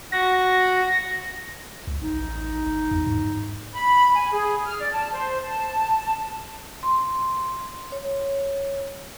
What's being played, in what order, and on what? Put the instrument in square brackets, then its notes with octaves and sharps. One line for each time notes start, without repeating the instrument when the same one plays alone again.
[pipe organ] F#4 [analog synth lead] A#6
[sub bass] C#2
[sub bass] A1 [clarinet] D#4
[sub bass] G1
E2
G#2
[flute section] B5
G#5
G#4
F6
D5
A5
C5
A5
[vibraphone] C6
C#5